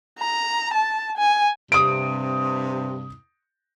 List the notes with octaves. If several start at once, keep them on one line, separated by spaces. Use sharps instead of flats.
A#5
A5
G#5
G2 C3 D#6 D7